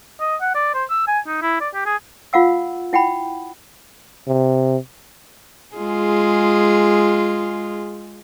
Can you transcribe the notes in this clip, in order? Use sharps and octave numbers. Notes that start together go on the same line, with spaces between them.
D#5
F#5
D5
C5
E6
G#5
D#4
E4
D5
G4
G#4
F4 F5 F#5 E6
E4 F#5 G5 B5
C3
G#3 F4 G#4